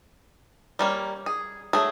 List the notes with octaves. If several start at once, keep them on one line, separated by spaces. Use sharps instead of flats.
G3 A#3 C#4
G#4
F#3 A3 G#4